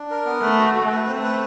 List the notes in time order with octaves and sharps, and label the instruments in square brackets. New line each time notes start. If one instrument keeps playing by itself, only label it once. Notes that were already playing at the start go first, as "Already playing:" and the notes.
Already playing: [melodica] D4
A#4
B3
[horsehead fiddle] A3 [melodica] B4
[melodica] F#4
F#4
B4
[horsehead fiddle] A3 [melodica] C4
[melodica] B4